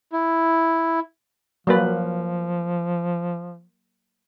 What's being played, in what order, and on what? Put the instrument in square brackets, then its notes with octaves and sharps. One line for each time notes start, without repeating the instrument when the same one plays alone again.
[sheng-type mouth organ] E4
[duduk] F3 [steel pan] F#3 A#3 B4